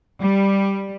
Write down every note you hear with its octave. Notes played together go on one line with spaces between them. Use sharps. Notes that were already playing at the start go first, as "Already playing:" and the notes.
G3